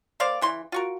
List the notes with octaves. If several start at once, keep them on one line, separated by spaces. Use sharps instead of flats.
A#3 C5 D5 F5
C#3 E3 C6
F4 F#4 A#4